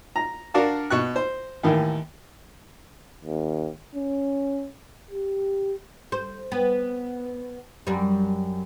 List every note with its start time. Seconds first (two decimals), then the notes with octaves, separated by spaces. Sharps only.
0.16 A#5
0.54 D4 F#4 A#4 D5 F5 A5
0.90 B2 C#6 F#6
1.16 C5
1.63 D#2 A2 D#3 E3
3.24 D#2
3.95 C#4
5.11 G4
6.12 C5
6.52 B3
7.87 F#2 G3